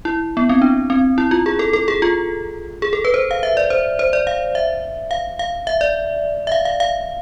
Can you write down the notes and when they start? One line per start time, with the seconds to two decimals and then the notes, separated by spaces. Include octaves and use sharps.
0.05 E4
0.37 B3
0.49 C4
0.62 D4
0.90 C4
1.18 E4
1.31 F4
1.46 G#4
1.59 A4
1.73 A4
1.88 G#4
2.02 F4
2.82 G#4
2.93 A4
3.05 B4
3.14 C5
3.31 F5
3.43 E5
3.57 D5
3.70 C5
3.99 C5
4.13 D5
4.27 F5
4.55 E5
5.11 F5
5.39 F5
5.67 E5
5.81 D5
6.47 E5
6.52 F5
6.65 F5
6.80 F5